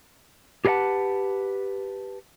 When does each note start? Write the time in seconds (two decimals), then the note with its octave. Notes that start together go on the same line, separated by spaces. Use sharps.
0.65 G4 G#4 B4 D#5 F#5 A5